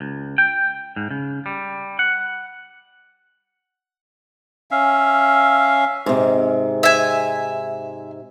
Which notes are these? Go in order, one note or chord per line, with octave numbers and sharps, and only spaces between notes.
C#2
G5
G#2
C#3
G3
F#5
C#4 E5 F5
G#2 C3
E5 G#5